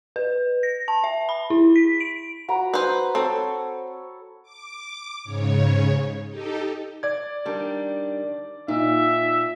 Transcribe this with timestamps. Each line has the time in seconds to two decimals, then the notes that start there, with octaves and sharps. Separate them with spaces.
0.16 B4
0.63 A#6
0.88 A5
1.04 E5
1.29 B5
1.50 E4
1.76 B6
2.00 D7
2.48 F#4 A#5 B5
2.74 B4 C5
3.15 C4 A4 C#5
4.43 D6
5.24 G#2 C#3 C#5
6.27 D#4 G4 A4
7.03 D5 G#6
7.45 D#3 G3 D4
8.68 A#2 D#4 E5